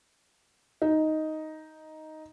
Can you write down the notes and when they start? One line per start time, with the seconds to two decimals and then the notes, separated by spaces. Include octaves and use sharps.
0.82 D#4